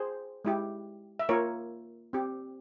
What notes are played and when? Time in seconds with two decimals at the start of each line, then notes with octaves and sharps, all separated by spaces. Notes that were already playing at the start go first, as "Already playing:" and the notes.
Already playing: G#4 C5
0.45 G#3 E4 G4
1.19 E5
1.29 A#3 F4 A#4 C#5
2.13 C4 G4